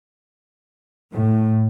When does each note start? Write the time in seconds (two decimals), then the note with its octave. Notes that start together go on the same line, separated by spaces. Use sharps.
1.11 A2